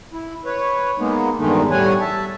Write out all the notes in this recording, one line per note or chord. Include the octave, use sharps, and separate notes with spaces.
E4
B4 C#5
G#3 A#3 B3 D#4
E2 G2 D#3 G#3 A3 D#4
A2 G3 C#5 F#5 G#5
E5 A5